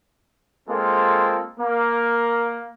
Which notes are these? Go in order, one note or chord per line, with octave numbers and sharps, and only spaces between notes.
G#3 A#3 C4 F4 A4
A#3